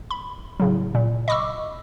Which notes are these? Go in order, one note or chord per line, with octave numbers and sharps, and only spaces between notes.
B5
A2 C#3 F#3
A#2
D#5 B5 C#6 D6 E6